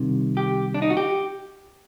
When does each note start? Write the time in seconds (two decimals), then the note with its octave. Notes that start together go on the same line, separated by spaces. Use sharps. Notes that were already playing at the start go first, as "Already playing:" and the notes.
Already playing: C2 C3 D#3
0.37 G4
0.74 D4
0.82 D#4
0.90 F#4
0.97 G4